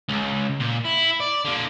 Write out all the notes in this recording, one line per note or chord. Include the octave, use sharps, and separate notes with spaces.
C#2
A#2
E4
D5
D3 A#3